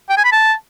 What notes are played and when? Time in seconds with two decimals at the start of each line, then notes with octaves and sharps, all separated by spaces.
0.09 G5
0.17 G#5
0.24 B5
0.32 A5